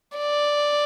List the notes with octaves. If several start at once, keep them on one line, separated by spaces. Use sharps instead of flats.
D5